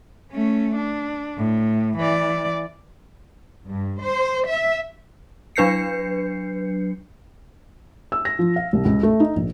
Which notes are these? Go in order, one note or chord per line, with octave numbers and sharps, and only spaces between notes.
A3 C#4
D4
A2
E3 D5
G2
C5
E5
F#3 D4 B4 G6 C7 C#7
E6
A#6
F3
F5
C2
C#2
A3
D#4
A#1